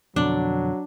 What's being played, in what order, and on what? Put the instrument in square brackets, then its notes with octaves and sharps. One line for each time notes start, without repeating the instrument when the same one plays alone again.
[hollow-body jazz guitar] F2 B2 D3 [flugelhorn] F#3 [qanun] D4